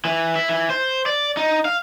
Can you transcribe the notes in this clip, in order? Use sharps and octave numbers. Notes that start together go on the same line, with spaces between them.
E3
E4
E3
C5
D5
D#4
F5